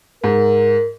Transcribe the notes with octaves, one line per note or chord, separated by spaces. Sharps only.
G#2 A#4